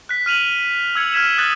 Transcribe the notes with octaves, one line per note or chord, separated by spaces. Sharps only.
F#6 B6
F6 D#7 F7 F#7
E6 G#6 C#7
E6 F6 G#6 B6 E7
D#6 E6 F#6 A6